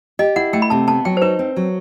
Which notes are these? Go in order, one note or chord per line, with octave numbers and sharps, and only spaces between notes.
G4 D#5
E4 F#5
A3 G5
B5
C3 A5
B3 A5
F#3 G5
C5
D#4 B4
C4
F#3